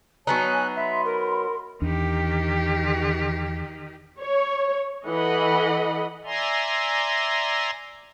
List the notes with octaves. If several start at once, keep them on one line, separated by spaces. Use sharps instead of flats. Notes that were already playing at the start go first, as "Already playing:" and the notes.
F#3 B3 D#4 C#5 G#5 A5 F#6
E5 B5 C6
A#4
E2 D#3 D4 G4
C#5
E3 A4 D#5 F#5 B5
D5 E5 G#5 A#5 C6